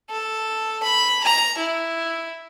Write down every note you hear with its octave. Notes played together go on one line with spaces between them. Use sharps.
A4
B5
A#5
E4